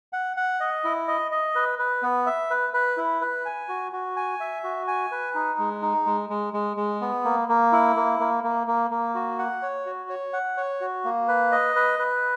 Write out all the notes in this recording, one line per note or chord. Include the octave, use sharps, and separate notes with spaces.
F#5
F#5
D#5
E4
D#5
D#5
B4
B4
B3
E5
B4
B4
E4
B4
G#5
F#4
F#4
G#5
E5
F#4
G#5
B4
D#4
G#3
D#4
G#3
G#3
G#3
G#3
B3
A#3
A#3
E4
A#3
A#3
A#3
A#3
A#3
F#4
F#5
C#5
F#4
C#5
F#5
C#5
F#4
A#3
B4
D#5
B4
B4